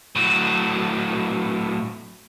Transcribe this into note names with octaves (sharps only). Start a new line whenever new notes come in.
A2 F#3